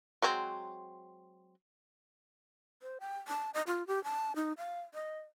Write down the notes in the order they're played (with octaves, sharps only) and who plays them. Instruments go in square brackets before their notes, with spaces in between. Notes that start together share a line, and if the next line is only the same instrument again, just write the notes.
[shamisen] F#3 G#3 C4
[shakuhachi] C5
G5
A5
D#5
F4
G4
A5
D#4
F5
D#5